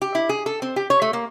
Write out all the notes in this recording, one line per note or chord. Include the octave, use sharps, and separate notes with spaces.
G4
E4
G#4
A4
C4
G4
C#5
A3
A#3